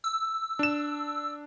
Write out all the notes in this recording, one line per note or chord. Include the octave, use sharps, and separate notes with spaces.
E6
D4 E7